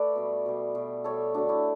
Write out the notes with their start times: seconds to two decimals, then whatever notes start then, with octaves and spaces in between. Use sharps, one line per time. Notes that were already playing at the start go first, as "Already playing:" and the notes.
Already playing: A3 A4 B4 D5
0.16 B2 G3
0.46 B2 G3
0.75 B2 G3
1.04 B2 G3 A4 C#5
1.34 D3 A3 D4 F#4
1.49 E4 G4